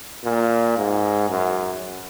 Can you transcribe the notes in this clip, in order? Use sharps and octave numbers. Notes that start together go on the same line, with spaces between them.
A#2
G#2
F#2